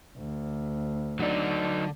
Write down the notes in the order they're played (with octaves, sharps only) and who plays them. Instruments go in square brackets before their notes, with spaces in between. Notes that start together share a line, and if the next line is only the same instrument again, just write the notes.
[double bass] D2
[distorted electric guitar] D3 D5 [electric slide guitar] F#3 D#4